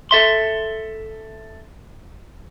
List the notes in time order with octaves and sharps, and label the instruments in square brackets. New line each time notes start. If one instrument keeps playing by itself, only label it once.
[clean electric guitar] A4 E5 C6